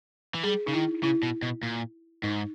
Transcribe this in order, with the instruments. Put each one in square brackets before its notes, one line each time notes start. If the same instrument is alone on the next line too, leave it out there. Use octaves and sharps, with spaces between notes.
[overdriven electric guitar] E3
[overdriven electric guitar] G3 [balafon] G#4
[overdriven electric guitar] C#3 [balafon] D#4
[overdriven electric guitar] D#3 [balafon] E4
[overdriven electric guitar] C#3 [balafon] E4
[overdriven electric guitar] B2
B2
A#2
[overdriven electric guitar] G#2 [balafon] D#4